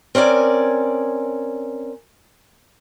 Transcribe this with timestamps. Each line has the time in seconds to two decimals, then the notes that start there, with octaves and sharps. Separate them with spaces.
0.15 C4 C#4 A#4 D5 G#5